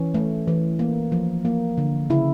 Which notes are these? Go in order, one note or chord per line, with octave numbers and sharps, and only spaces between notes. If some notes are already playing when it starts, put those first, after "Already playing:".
Already playing: E3 C#4
A3
E3
A#3
F3
A#3
D3
C#3 E4